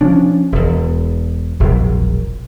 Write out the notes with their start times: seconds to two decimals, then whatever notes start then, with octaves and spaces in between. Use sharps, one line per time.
0.01 F3 C#4 D4
0.52 E1 E2
1.60 E1 A#1 F#3